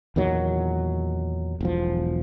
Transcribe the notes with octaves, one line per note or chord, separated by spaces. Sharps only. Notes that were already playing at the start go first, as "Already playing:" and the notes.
E2 A#2 D#3 F#3
E1 B1 F3